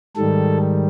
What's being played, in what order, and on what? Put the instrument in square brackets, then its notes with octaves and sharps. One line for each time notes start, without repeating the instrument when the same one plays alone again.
[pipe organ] G#2 D#3 G3 A4